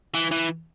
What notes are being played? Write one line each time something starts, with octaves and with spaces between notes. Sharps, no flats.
E3
E3